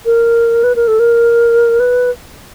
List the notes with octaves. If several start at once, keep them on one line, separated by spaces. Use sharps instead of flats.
A#4
B4
A#4
A4
A#4
B4